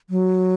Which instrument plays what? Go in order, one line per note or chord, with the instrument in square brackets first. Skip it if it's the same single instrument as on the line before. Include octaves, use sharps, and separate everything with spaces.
[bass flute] F#3